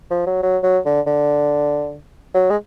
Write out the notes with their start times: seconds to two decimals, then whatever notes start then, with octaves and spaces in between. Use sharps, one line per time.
0.11 F3
0.27 F#3
0.43 F#3
0.64 F#3
0.86 D3
1.07 D3
2.35 F#3
2.50 G#3